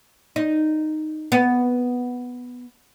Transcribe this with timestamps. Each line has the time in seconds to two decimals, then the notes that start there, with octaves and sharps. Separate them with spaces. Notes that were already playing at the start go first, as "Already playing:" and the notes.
0.36 D#4
1.32 B3